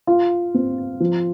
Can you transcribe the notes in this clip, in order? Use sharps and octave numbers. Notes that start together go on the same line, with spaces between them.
F4
C4
F3